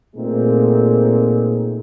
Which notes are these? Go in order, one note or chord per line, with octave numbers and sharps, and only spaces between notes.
A#2 A3 A#3 C4 D#4 G#4